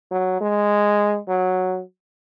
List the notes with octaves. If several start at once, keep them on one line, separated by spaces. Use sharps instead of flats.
F#3
G#3
F#3